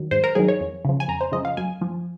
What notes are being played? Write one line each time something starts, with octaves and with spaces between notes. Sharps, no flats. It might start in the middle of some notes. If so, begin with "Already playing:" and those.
Already playing: D#3 F#3
G#2 C5
A#4
D#3 F#3 G#4
C#5
F2
C#3 F3
G#5
F2 A#5
C5
C#3 F3 D#5
F5
F#2 G#5
F3